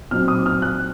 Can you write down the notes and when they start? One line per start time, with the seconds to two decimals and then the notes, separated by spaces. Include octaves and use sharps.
0.11 A#2 F#3 C4 D#4 F6
0.28 D#6
0.46 F6
0.62 F#6